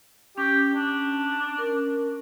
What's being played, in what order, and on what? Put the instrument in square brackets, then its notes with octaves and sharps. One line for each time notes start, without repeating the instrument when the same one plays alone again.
[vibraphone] C#4 [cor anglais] G4
[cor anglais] D4
[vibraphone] C#4 A#4